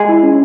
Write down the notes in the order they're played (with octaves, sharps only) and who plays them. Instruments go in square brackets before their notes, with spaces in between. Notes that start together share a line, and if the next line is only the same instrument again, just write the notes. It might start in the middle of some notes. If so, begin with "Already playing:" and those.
Already playing: [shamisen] G#3
[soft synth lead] E4
C#4